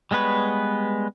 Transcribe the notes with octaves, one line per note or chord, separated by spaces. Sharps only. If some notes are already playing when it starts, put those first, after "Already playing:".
G3 G#3 B3 B4 C#5